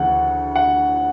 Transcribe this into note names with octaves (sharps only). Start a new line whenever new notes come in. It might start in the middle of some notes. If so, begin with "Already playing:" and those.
Already playing: D2 C#3 E3 F#5
F#5